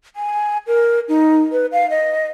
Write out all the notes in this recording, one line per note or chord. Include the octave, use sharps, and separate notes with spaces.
G#5
A#4
D#4
B4
F5
D#5